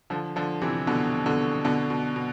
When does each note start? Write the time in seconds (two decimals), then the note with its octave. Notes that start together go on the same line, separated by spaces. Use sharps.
0.10 D3 F3
0.36 D3 F3
0.62 C3 E3
0.87 B2 D3
1.26 B2 D3
1.64 B2 D3
1.90 B2
2.16 B2